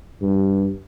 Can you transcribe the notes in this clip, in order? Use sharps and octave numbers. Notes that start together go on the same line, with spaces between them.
G2